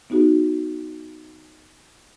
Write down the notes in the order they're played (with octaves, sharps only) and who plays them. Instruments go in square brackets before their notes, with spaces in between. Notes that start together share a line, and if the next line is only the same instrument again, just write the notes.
[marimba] B3 D#4 F#4 G#4